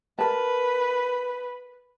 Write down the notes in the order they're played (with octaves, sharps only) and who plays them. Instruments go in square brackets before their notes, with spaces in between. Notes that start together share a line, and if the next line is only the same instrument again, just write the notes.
[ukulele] A#4 A5 [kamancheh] B4